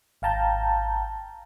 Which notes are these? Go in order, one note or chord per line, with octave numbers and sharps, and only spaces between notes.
G#1 F5 G5 A5 A#5 G6